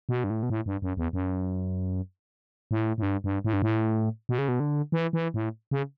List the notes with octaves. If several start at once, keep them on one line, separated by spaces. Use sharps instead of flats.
B2
G2
A2
B2
A2
G2
F#2
E2
F#2
A2
A2
G2
G2
A2
G2
A2
B2
C#3
B2
D3
E3
E3
A2
C#3